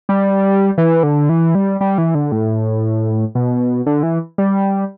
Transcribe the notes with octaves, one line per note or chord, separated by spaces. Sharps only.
G3
E3
D3
E3
G3
G3
E3
D3
A2
B2
D3
E3
G3